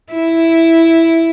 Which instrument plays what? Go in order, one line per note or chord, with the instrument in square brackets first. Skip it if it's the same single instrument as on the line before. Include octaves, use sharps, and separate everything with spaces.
[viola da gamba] E4